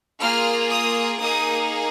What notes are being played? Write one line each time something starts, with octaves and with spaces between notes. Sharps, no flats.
A#3 F4 G#4 F6
D#6
A#3 D#4 G#4 D#6